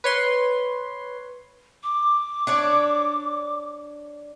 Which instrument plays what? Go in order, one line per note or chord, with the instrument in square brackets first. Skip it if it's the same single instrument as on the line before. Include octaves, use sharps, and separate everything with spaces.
[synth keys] B4 C#5 C6
[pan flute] D6
[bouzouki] D4 C#5 D5